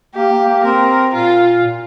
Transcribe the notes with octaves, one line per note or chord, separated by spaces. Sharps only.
A#3 G4
A#3
A#3
C4 A#4
A#2 F4
A#2